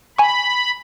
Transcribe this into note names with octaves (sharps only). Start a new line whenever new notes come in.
G#5 B5 C#6